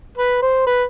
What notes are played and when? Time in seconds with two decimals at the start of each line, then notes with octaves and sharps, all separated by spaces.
0.18 B4
0.42 C5
0.66 B4